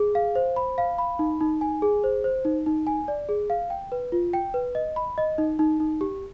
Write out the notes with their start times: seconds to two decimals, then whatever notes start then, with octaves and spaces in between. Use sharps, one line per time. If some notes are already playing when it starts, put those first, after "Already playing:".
Already playing: G#4
0.15 F5
0.35 C5
0.56 B5
0.78 F5
0.98 B5
1.19 D#4
1.41 D#4
1.61 G#5
1.82 G#4
2.04 C5
2.24 C5
2.45 D#4
2.66 D#4
2.87 G#5
3.08 D5
3.29 G#4
3.50 F5
3.70 G5
3.92 B4
4.12 F4
4.33 G5
4.54 B4
4.75 D#5
4.96 B5
5.18 D#5
5.38 D#4
5.59 D#4
5.80 D#4
6.01 G4